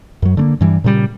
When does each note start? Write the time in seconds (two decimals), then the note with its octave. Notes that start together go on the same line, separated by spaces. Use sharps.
0.22 F#2 F#3
0.37 D3 A3 A#3
0.61 G2 E3 G3
0.84 A#2 C#3 F3 G3